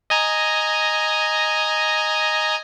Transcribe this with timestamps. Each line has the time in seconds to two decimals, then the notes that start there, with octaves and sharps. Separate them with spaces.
0.10 D#5 G#5 A#5